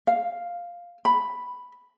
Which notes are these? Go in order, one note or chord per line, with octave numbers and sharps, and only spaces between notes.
F5
B5